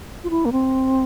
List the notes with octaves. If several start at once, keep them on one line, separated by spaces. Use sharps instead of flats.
F4
E4
A#3
C4